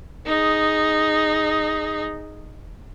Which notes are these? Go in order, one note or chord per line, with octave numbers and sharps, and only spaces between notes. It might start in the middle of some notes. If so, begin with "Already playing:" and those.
D#4 G#4